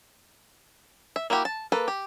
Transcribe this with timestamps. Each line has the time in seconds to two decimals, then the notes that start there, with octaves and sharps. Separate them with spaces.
1.16 E5
1.30 A#3 E4 F#4 G4
1.45 A5
1.72 A#3 A4 B4
1.88 G4